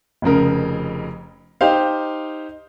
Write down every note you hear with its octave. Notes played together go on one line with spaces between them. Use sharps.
F1 F2 C#3 A#4
D#4 G4 C5 F5